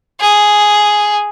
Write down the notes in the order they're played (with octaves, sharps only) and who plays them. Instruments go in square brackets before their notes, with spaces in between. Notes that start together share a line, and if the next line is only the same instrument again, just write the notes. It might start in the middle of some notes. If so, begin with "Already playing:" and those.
[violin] G#4